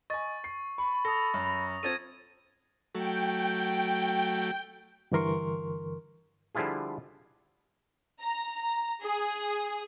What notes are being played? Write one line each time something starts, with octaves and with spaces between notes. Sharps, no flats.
D#5 G#5 C#6 A6
C7
B5 C#6
A4 D#6 A#6
F#2
C4 F4 A4 G#6 A6 D#7
F#3 A3 G5
G2 D3 E3 A#4 C6 C#6
D3 F3 G3 E4 F4 G#4
A#5
G#4